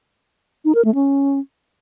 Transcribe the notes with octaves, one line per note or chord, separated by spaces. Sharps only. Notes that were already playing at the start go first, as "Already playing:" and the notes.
D#4
A#4
A3
C#4